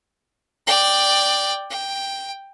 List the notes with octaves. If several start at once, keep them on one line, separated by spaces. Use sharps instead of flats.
D5 G5
G5